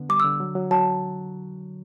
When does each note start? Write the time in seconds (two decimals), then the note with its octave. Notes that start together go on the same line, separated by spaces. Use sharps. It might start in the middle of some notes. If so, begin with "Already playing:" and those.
Already playing: D3 B3
0.09 G3 D6
0.20 E6
0.25 D3
0.40 F#3
0.55 F#3
0.71 F#3 A5